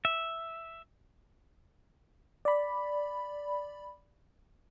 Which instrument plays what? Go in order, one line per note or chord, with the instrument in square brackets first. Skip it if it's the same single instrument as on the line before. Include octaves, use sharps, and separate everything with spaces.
[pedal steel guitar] E5
[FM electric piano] D5 B5